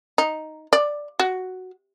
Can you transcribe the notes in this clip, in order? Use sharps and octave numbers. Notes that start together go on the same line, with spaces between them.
D#4
D5
F#4